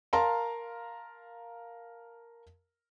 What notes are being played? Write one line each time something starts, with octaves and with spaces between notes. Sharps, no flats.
A#4 F5 A5 A#5 C6